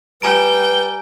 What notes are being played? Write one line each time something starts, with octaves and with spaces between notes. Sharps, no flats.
G3 B4 G5 G#5 A#5 D7